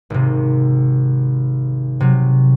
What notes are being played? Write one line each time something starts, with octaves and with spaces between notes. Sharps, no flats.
G#1 C3
C3 F#3